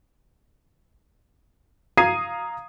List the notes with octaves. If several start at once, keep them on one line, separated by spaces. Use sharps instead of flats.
F5 A#5 D#6 G#6 C7 D#7